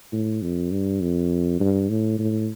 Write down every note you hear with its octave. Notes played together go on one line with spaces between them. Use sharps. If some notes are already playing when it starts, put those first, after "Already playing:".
A2
F2
G2
F2
G2
A2
A2